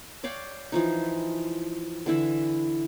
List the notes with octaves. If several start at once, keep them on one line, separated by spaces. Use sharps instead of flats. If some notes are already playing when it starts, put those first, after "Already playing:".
C#5 D5 F5 G5
E3 F3 D#4
D3 E3 E4 E5